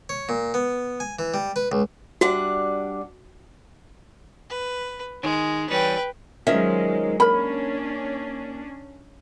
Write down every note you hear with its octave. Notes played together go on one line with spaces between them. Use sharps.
C#5
A#2
B3
G#5
E3
G3
B4
C#2
G3 D4 F#4 F#5
B4
D#3 G#3
E3 G3 C#4 B4 G5
D#3 F3 F#3 G#3 C#4 E5
D#2 C#4 D4 A#4 B5